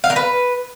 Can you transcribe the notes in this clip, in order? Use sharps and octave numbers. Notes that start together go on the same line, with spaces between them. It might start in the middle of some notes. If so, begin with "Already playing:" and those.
F5
A#4
B4